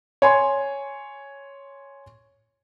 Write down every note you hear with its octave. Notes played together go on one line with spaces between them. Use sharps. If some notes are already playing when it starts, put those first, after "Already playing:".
C#5 G#5 C6